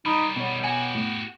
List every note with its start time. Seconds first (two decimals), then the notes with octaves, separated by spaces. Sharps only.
0.06 D#3 G3 D#4 B5
0.36 B2 B3 C#5
0.64 F#4 G4 G#5
0.95 A2